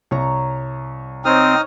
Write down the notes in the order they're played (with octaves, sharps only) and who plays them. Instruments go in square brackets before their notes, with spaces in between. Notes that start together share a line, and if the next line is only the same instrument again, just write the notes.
[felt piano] C2 [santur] C#5 A#5
[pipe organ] C4 [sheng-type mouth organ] D#4 D#6 F6 [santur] C5 C#5